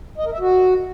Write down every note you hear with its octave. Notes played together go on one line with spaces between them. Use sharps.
D#5
A#4
E5
F#4